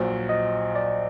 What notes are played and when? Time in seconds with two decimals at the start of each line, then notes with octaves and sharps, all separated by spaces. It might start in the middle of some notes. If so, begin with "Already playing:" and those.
Already playing: A#1 A#2 F#3 C5
0.29 D#5
0.76 D5